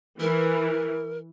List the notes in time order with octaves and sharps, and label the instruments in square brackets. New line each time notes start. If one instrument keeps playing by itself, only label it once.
[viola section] E3 [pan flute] A#4